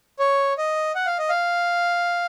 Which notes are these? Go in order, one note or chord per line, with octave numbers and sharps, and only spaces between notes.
C#5
D#5
F#5
F5
D#5
F5